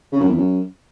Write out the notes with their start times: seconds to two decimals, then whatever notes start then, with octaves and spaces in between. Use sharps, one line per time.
0.12 C#3
0.20 F#2
0.29 E2
0.37 F#2